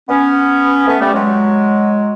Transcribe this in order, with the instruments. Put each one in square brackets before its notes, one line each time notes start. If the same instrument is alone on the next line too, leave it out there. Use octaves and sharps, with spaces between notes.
[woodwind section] B3 C#4
A3 B3
G3 A3
F#3 G#3